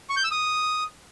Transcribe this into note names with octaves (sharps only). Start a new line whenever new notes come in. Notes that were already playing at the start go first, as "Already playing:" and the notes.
C#6
G6
E6
D#6